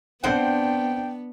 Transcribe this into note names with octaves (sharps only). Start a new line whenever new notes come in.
B3 C4 D4 C5 F#5 G5